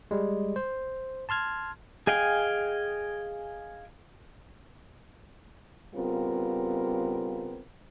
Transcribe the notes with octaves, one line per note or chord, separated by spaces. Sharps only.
G3 G#3
C5
A5 C6 F6 G#6
G#4 D#5 F5 G5 G#5
C#3 G3 B3 C4 F4 A#4